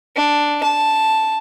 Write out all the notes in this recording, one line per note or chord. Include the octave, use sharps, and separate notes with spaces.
D4
A5